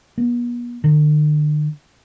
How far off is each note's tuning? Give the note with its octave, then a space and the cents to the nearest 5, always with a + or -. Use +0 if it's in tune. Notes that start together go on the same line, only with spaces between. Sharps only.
B3 -40
D3 +40